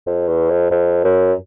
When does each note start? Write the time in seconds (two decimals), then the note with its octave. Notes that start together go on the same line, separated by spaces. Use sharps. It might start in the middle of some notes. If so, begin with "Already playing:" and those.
0.07 F2
0.28 E2
0.50 F2
0.71 F2
1.04 F#2